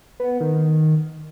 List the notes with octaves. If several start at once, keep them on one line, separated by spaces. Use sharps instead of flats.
B3
D#3